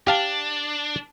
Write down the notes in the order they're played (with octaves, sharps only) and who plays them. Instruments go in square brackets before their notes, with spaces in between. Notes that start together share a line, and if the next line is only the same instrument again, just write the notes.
[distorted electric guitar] D4 [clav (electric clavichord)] G4 F5 A5